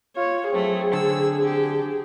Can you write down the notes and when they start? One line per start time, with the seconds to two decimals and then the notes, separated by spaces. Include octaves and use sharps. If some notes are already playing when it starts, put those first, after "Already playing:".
0.17 F4 C#5
0.52 F#3 A3 C4 G#4
0.93 D3 E6
1.43 G4